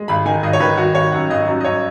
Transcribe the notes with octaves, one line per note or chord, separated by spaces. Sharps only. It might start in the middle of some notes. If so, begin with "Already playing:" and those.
Already playing: G#3
G#1 B5
D#3 G#5
G#1 D#5
C#5
D#3 B4
G#1 F#4
G#1 C#5
F#2 F#5
G#1 D#5
F#2
D#5
F#2 C#5